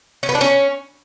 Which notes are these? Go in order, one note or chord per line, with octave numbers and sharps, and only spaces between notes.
C#4
B3
D4
C#4